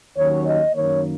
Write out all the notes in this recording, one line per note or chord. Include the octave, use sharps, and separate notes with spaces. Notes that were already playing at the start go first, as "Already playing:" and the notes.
D#2 D#3 F#3 C#4 C#5
D#5
F#2 D#3 A#3 C#5